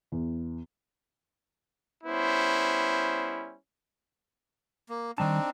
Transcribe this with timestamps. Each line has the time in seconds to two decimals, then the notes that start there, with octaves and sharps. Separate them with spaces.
0.12 E2
2.04 G3 B3 C#4 E4 C5
4.89 A#3
5.18 D#3 G3 C4 D4 D#4 A5